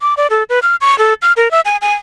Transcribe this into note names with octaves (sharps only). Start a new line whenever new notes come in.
D6
D5
A4
B4
F6
C#6
A4
F6
A#4
E5
G#5
G#5